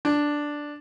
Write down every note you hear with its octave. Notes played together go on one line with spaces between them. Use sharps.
D4